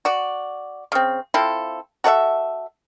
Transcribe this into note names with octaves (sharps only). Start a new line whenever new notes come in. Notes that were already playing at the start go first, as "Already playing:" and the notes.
F#4 D5
C#3 C4
C4 E4 F4 A4
F#4 A4 D5 E5